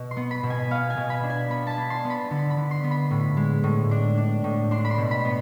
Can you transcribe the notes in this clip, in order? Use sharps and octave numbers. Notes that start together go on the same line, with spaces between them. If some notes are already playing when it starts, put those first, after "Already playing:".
Already playing: B2
C6
B3
B5
B2
G#5
B3 F5
G#5
B2
B5
D4
G#5
B3 B5
A5 B5
D4
C6
B3
B5
D3
B5
D3
C6
B3
B5
A2
G#3
A2
D4
D4
A2
D4 C6
B5
C6
B2
B5
B3